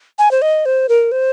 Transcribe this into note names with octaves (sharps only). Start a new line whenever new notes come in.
G#5
C5
D#5
C5
A#4
C5